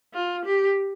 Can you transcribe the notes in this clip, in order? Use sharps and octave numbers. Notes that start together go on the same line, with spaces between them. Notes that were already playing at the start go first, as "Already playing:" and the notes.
F4
G4